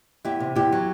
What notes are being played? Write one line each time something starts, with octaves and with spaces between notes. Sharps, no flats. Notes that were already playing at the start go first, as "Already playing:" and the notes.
E2 E4 G4
C3
E2 E4 G4
F#3